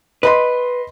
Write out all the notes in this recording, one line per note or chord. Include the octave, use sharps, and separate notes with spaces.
B4 D#5 B5 C6